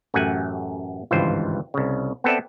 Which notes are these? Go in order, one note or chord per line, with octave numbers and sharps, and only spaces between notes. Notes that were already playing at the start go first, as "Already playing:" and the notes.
A1 F#2 A3 G4 F#5 G#5
G#1 C#2 G2 E3 F4 C5
C2 C#3
B3 C4 A4 B4 D5 E5